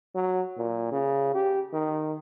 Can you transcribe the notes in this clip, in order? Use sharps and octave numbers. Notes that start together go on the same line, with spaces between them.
F#3
A#2
C#3
G4
D#3